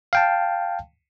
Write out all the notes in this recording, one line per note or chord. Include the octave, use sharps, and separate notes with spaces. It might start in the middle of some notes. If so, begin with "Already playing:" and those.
F5 G5 A5